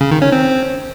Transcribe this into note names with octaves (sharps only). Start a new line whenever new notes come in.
C#3
D#3
C#4
C4